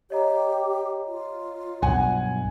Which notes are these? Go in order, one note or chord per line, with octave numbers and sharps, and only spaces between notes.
G4 C#5 D#5 A#5
F4
B1 G2 F#5 G#5